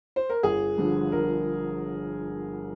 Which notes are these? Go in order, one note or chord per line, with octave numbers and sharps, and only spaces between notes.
C5
A#4
G1 G#4
G2 D3 F3
G1 A#4